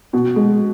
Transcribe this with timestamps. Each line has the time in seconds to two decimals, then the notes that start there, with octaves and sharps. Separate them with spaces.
0.13 B2
0.36 G#3